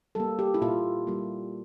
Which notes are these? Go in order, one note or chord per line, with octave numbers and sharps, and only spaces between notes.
G3 A#3 A4
G4
E4
A#2 F4
G3 A#3